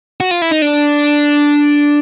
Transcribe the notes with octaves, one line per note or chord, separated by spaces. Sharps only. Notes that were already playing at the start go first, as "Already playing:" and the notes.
F#4
F4
E4
D#4
D4